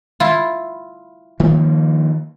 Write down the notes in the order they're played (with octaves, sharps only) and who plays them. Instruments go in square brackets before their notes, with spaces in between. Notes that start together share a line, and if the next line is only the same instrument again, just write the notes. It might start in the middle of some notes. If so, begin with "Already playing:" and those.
[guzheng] E4 F4
[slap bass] D#3 F3 A#3